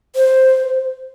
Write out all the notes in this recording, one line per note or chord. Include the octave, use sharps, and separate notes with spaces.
C5